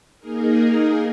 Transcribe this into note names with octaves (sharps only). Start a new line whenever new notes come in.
A#3 D#4 G#4 A#4